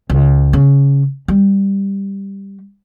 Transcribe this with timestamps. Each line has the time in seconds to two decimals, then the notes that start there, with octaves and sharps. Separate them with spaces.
0.10 C#2
0.53 C#3
1.28 G3